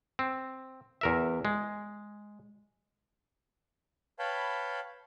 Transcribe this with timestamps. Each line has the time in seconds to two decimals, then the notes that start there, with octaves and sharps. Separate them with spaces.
0.19 C4
1.01 E2 A#4 E5
1.45 G#3
4.19 B4 C#5 F5 G5 A5 B5